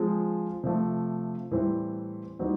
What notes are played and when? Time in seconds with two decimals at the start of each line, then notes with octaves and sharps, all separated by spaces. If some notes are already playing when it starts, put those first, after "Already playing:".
Already playing: F3 G#3 C4 F4 G#4
0.64 C3 F3 A3
1.51 A2 E3 G3 C4 E4
2.39 E3 G3 C4 D#4 F#4